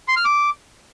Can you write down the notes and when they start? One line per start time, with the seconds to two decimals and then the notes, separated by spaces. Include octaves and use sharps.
0.08 C6
0.17 F6
0.25 D6